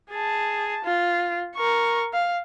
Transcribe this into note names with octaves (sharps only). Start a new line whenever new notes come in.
G#4 A5
F4
A#4 C#6
F5